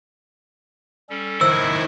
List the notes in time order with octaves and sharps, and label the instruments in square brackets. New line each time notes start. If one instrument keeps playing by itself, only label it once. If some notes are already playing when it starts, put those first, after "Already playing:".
[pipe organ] G3 C#4 A4
[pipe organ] A2 F#3 [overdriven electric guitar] D#3 E4 [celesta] C5 [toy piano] E6